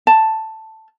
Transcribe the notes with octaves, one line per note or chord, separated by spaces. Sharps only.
A5